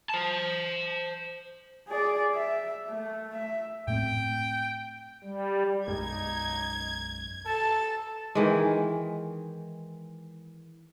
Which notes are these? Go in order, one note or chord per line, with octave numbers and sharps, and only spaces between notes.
C5 A5
G#4 D5
E5
A3
E5
A2 A3 C4 G5
G3
B1 F#2 G#3 D#4 G#6
A4 A5
D#3 E3 G#3